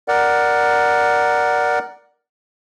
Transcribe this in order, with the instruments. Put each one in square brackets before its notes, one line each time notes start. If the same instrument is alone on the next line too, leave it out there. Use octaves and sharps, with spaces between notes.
[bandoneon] A#4 D5 F#5